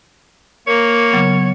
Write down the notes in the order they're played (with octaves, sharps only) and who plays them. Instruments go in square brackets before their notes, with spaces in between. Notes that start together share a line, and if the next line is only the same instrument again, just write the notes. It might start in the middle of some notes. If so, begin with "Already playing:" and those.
[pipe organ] A#3 [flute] A#4 [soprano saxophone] C#5
[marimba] C#3 F#3 B3